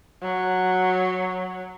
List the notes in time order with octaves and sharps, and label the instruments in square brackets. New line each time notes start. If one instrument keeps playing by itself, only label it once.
[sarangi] F#3